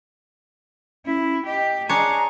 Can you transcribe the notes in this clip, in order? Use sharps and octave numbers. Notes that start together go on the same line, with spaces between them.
C#4 E4
G4 D#5
D4 G#4 C#5 A#5